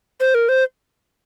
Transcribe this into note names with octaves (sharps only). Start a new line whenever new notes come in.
C5
A#4
C5